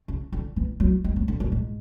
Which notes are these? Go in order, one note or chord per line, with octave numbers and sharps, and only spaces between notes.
C#3
D3
E3
F#3
G#3
F#3
D3
F#2
G#2